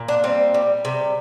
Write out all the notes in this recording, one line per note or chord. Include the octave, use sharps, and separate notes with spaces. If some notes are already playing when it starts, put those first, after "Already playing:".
Already playing: A#2
D4
G3 C4
G3
C3